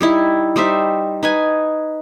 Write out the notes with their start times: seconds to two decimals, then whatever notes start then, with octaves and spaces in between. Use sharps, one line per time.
0.01 G3 D#4 E4
0.56 G3 D#4 C5 E5
1.23 D#4 B4 G#5